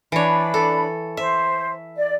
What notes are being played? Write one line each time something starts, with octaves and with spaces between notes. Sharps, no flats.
E3 D4 C#5 B5
A4
C5 E5
D5